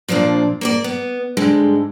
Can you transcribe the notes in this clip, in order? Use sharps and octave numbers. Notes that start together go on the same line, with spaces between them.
A#2 F3 A#3 C4 D4
A#3 C#5 D5
B3
G#2 D3 G3 G#3